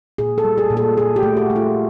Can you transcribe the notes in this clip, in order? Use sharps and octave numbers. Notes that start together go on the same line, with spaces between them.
A#2 G#4
A4
G3
G#4
A#2
A4
A#2 G#4
G4
A3
F#4
A3
F4